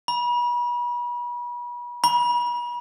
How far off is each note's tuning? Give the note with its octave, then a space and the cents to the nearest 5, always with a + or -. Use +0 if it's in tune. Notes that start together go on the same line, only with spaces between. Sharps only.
B5 -35
B5 -40